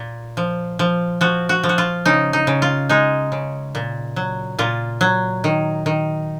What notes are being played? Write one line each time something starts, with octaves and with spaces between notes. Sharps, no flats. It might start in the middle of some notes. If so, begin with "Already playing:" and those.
Already playing: A#2
F3
F3
F3 F#4
F#4
F3
F#4
F4
C#3 D#4
D#4
C#3
F4
G#3 D#4
C#3
A#2
F#3
A#2 F4
F#3
D#3
D#3